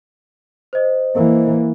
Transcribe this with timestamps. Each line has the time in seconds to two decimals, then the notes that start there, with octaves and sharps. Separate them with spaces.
0.73 C5 D#5
1.14 E3 A#3